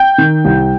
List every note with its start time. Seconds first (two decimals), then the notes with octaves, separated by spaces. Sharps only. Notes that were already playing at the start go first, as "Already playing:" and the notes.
Already playing: G5 G6
0.18 D#3
0.45 C2